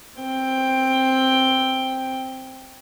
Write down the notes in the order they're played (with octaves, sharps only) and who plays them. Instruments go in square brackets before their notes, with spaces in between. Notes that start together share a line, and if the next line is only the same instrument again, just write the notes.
[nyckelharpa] C4 G5